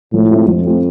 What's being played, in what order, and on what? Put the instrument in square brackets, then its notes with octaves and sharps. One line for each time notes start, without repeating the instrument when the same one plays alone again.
[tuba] A2 [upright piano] F3
[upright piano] A3 C4 F4
[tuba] F2 [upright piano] F3
[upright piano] A3 C4 F4